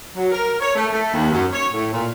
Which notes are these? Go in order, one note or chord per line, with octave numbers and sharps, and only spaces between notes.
F#3
A#4
C#5
A3
A3
D#2
F#2
C#5
A2
A#2